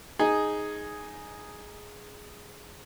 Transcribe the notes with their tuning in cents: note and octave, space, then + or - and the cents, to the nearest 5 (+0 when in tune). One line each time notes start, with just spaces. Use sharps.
D#4 +0 G#4 +0 D#5 +0